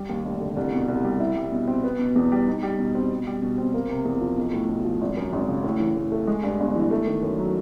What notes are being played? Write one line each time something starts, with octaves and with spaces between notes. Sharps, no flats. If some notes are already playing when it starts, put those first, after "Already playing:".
Already playing: G3
D#2
F1
D3
C2
B2
C2
G3
E4
G3
B2
C4
B3
B2
E2
G3
D#4
G3
B2
C4
B2
G3
B2
C4
A#3
C3
E2
F3
B1
A2
B1
F3
G#1
F#2
G#1
C#3
A2
E3
A2
A3
G#3
G2
G1
E3
A3
D#3
F#2
F#3